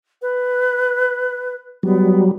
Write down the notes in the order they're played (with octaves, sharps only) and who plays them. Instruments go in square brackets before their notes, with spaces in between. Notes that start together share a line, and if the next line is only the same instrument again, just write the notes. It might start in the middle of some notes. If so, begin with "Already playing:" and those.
[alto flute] B4
[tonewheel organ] F#3 G3 [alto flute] B3